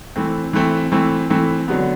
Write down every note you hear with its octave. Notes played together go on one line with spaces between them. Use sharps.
E3 A3 C4
E3 A3 C4
E3 A3 C4
E3 A3 C4
D3 F#3 B3